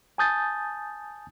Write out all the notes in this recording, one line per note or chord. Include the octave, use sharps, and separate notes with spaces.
G#5 A5 D#6 G6 A6